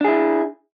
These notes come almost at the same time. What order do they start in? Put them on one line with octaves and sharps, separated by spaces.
D4 G#4 E4